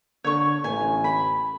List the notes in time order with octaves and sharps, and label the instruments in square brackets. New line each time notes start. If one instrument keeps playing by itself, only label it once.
[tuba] D3 [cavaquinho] C#5 C#6
[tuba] A1 [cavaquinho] G#5
[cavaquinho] B5